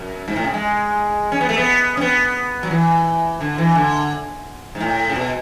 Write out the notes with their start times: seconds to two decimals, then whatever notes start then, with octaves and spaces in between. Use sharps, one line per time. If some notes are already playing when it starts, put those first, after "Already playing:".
Already playing: F#2
0.28 G#2
0.36 A2
0.44 C#3
0.54 G#3
1.32 C#4
1.41 B3
1.49 A3
1.57 B3
1.97 C#4
2.01 B3
2.63 F#3
2.71 E3
3.41 D3
3.58 E3
3.75 D3
4.75 G#2
4.80 A2
5.10 C#3
5.15 B2